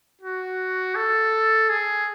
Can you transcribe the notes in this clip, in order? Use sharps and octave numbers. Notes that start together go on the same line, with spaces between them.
F#4
A4
G#4